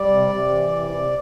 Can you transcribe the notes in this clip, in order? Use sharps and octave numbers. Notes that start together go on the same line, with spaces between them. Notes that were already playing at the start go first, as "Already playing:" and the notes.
Already playing: G3 D5
C3
C3
E3
C3
C3